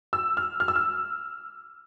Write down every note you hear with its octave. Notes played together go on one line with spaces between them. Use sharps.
E6
F6
F6
E6
F6